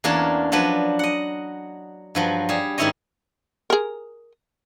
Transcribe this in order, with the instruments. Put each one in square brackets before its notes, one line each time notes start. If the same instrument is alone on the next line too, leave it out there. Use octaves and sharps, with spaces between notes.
[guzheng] E2 A#3 C#4 D4 A#4 A5
F3 F#3 D4 B4
D#5 F#5
G2 F3 F#3
G3 G#4
G#2 D#3 C#4 E4 C#5 D#5
[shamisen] G#4 A#4